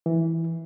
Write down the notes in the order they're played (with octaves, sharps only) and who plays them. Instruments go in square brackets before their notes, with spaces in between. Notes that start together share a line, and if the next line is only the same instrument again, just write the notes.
[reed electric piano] E3